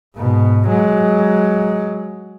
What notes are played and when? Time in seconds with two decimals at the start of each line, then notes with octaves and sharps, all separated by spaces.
0.17 G#2 B2
0.68 F#3 G#3